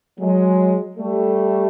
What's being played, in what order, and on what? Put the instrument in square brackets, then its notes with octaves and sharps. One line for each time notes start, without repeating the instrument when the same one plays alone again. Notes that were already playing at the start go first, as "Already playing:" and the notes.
[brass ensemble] F#3 G#3
G3 A3